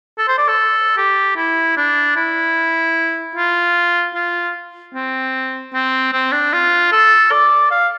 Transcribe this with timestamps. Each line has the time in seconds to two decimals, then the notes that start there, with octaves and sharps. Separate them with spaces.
0.19 A4
0.28 C5
0.38 D5
0.48 A4
0.97 G4
1.37 E4
1.77 D4
2.16 E4
3.35 F4
4.15 F4
4.94 C4
5.73 C4
6.13 C4
6.32 D4
6.53 F4
6.92 A4
7.31 D5
7.71 F5